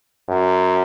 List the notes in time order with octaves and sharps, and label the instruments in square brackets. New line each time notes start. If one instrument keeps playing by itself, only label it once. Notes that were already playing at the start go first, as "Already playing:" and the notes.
[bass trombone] F#2